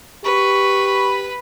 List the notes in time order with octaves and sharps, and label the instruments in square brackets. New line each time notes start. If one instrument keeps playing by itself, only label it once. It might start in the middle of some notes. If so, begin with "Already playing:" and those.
[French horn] G4 [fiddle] B4 B5 [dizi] C#6